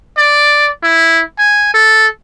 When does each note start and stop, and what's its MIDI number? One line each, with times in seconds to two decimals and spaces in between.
0.17 0.68 74
0.83 1.21 64
1.39 1.73 80
1.74 2.07 69